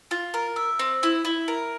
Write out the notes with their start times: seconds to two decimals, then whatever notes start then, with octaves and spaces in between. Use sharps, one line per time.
0.11 F4
0.34 A#4
0.56 E5
0.79 C4
1.03 E4
1.25 E4
1.48 A#4